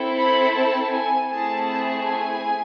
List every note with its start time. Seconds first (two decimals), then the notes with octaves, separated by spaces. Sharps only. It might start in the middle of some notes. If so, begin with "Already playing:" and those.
Already playing: C4 E4 A4
0.17 B5
0.54 A5
0.92 G#5
1.30 A3 C4 E4 G#4 A5
1.68 A5
2.06 G#5